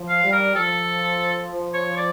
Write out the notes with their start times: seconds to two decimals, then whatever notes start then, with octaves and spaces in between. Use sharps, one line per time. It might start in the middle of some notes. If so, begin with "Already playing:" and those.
Already playing: F3
0.08 F5
0.24 G3
0.33 A#4
0.56 F3 A4
1.74 C#5
1.97 D5